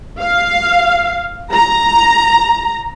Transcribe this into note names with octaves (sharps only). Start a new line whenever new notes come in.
F5
A#5